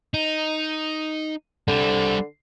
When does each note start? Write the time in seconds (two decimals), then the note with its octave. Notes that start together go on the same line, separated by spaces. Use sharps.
0.14 D#4
1.68 D3 G3 C4